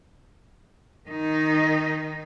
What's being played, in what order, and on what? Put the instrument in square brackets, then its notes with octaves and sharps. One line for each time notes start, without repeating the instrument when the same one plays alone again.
[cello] D#3 D#4